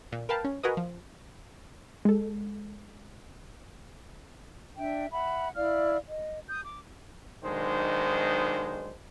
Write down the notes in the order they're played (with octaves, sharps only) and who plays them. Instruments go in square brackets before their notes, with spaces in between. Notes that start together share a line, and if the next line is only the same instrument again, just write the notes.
[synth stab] A#2
A#4 B4 F5 G5 A5
C#4
F#4 G#4 A#4 B4 D#5
F3
[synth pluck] G#3 A4
[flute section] D4 E5 G5
E5 F#5 B5
E4 D5 F5 F6
D#5
D#6 G6
D6
[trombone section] B1 D#3 G#3 D4 C5